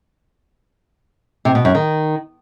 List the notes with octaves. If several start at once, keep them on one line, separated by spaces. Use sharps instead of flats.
C3
B2
F#2
D#3